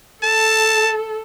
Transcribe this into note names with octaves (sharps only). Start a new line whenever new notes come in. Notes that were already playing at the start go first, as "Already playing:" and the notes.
A4 A5